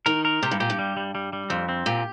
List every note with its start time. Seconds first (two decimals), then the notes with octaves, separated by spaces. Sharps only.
0.06 D#3 A#4
0.25 A#4
0.43 C3 G4
0.51 G2
0.60 A#2 G4
0.70 G2
0.79 G3
0.97 G3
1.15 G3
1.33 G3
1.50 F2 C4
1.69 C4
1.86 A#2 G4